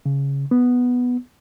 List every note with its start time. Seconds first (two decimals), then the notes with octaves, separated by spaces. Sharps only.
0.06 C#3
0.51 B3